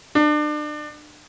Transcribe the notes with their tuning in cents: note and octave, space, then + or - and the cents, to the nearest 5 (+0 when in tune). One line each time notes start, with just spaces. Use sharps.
D4 +35